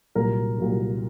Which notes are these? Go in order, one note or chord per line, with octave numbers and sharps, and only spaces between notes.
C2 A#2 F#3 A#4
C2 A#2 F#3